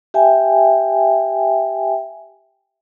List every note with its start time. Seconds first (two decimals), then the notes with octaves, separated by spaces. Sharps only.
0.14 G4 E5 G5 G#5